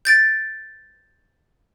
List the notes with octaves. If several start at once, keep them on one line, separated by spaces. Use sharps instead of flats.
G6 A6 D7